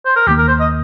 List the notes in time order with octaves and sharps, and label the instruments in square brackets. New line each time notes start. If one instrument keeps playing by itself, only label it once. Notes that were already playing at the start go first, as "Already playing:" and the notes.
[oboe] C5
A#4
[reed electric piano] D#2 D#3 A#3 [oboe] G4
[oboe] A#4
C5
D#5